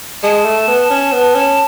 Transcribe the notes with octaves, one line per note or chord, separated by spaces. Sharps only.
G#3 A5
A3
B3
C#4
B3
C#4